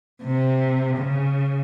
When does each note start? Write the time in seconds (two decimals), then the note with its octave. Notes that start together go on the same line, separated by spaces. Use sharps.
0.24 C3
0.97 C#3